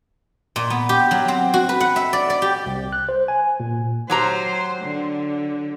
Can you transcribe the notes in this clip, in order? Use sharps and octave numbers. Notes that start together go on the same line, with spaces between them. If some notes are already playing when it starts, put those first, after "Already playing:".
A#2
B3
G4
F#3
C4
F#4
B4
F#5
E5
D5
D5
G4
C2
F#6
C5
G#5
A#2
F#3 G4 C5 A#5
D3